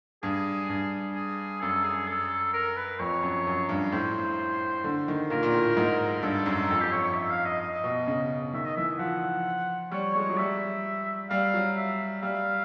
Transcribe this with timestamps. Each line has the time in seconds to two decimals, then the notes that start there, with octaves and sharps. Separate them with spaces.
0.23 G2 G#4
0.69 G2
1.15 G#4
1.61 F#2 A4
1.84 G#4
2.08 A4
2.54 A#4
2.76 B4
2.99 F2 C#5
3.22 F#2
3.47 F#2
3.69 G2
3.92 A2 C5
4.84 D3
5.08 D#3
5.30 A#2 A#4
5.43 A#2
5.53 A2
5.77 G#2
6.22 G2 A4
6.46 F#2
6.70 F2 A4
6.81 G4
6.93 C#5
7.03 C#5
7.15 E5
7.30 F5
7.45 D#5
7.61 D#5
7.84 B2
8.07 C#3
8.53 D#3 E5
8.66 D#5
8.77 E3 E5
8.99 F3 F#5
9.91 G3 C#5
10.14 G#3 C#5
10.30 F#3
10.37 G3 E5
11.30 G3 F5
11.54 F#3
11.77 E5
12.22 G3 F5